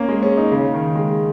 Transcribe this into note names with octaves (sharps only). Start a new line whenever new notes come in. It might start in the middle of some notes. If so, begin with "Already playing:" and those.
Already playing: A#3 C#4
G#3
C#4
D#4
C#3
D#3
G#3